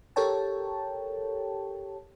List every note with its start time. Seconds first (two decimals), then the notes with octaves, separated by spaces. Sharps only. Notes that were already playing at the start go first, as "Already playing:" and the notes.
0.16 G4 A4 A#4 C#5 G5 A5